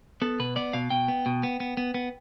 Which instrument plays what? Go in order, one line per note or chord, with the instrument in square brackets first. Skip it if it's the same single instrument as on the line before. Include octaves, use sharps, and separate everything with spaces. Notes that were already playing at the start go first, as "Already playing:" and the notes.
[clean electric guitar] B3 A4
B2 B4
B3 D5
B2 F5
B2 G5
B3
B2
B3
B3
B3
B3